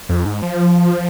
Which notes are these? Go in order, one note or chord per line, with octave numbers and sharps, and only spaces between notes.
F2
G#2
F3